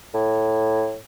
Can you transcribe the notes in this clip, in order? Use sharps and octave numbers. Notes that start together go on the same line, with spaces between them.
A2